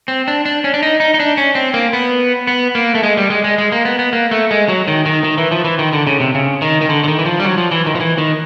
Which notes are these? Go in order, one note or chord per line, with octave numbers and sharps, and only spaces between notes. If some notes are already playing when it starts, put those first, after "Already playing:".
C4
D4
D4
C#4
D4
D#4
D#4
D#4
D4
C#4
C4
A#3
B3
B3
A#3
A3
G#3
G3
G#3
G#3
G#3
A#3
B3
B3
A#3
A3
G#3
F#3
D#3
D#3
D#3
E3
F3
E3
D#3
D3
C#3
C3
C#3
D#3
D#3
D3
D3
D#3
E3
F3
G3
F#3
F3
E3
D#3
F3
E3
D#3